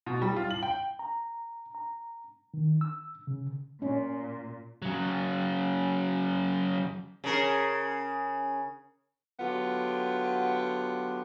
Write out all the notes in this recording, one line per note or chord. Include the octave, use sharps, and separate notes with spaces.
B2
G3
F4
F#7
G5
A#5
A#5
D#3
E6
C#3
A#2 C#4
C#3 F#3
C#3 A#4
D3 F#3 B3 F4 G4